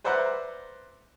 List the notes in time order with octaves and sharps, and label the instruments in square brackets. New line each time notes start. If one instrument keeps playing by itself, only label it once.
[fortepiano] B4 C5 D5 E5 F#5 A#5